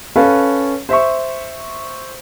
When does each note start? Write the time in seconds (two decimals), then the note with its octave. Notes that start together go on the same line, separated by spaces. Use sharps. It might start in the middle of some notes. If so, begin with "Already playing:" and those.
0.16 C#4 A4 B4 F5
0.89 C5 E5 C#6